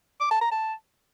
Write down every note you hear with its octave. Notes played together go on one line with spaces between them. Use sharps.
D6
A5
A#5
A5